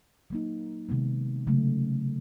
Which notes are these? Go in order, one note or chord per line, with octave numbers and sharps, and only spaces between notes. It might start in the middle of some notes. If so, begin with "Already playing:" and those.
F#3 A#3 D#4
C3 D#3 G#3 B3
C#3 F#3 A3